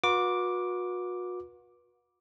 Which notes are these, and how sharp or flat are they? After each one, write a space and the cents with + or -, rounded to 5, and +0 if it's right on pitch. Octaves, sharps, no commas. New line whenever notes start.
F#4 -40 B4 -35 D6 +0